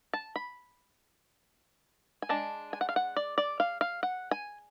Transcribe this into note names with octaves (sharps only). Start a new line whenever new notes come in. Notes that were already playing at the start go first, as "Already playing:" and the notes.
A5
B5
G#5
G#3 D4 A5
G#5
F#5
F5
F#5
D5
D5
F5
F5
F#5
G#5